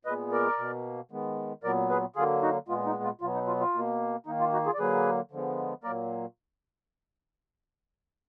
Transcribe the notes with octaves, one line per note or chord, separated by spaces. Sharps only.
A#2 G#3 B3 B4 D#5
A#4 D5
B2 A#3
D#3 G#3 B3
A#2 F#3 B3 A#4 D5
G#4 B4
D3 F#3 A#3 F4 G#4
D#4 F#4
A#2 G#3 B3 F4
D#4
F4
B2 F#3 B3 F4
D#4
F4
F4
B2 A#3
D#3 A#3 D#4
F4
D#4 F#4
F4 G#4
D5
D3 F#3 A#3 G#4 B4
D3 F3 G#3 B3
A#2 F#3 A#3 A#4 D5